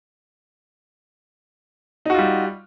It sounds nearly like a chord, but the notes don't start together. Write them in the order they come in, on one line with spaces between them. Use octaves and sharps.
D#4 F#4 F4 G3